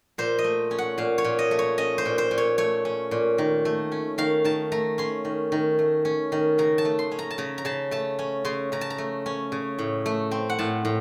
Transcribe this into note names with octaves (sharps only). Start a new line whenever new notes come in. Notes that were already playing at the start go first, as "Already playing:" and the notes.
A#2 C5
D#5
A3
C#4
F#5
A#2 F5
C#5
A#2
D#5
A3
C#5
C#4 D#5
C5
A#2
C5
A#2
C#5
A3 C#5
C#4
A#2
D#3
A3
C#4
D#3 F5
D#3 A5
A3 A#5
C#4 C6
D#3
D#3
A3
C#4
D#3
C#3 A#5
A5
A3
C6
C#4
A#5
A5
C#3 A#5
A#5
C#3 A5
A3 A5
C#4
C#3 C6
C#3 A#5
A5
A#5
A3
C#4
C#3
A2
A3
C4
F#5
A2 A5
A2